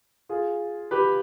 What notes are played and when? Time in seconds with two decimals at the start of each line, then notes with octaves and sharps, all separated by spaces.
0.29 F4 G#4
0.91 G4 B4